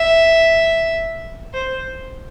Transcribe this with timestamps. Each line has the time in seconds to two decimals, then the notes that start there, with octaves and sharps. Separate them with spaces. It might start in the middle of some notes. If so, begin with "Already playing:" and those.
Already playing: E5
1.53 C5